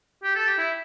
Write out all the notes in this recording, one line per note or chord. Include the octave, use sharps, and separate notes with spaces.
G4
A4
G4
E4